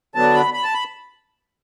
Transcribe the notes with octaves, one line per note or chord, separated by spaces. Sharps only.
D3 F#3 B3 D4 A5
B5
B5
A5
B5